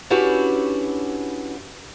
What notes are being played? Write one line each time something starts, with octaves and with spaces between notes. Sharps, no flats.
C#4 D4 E4 F#4 G4 B4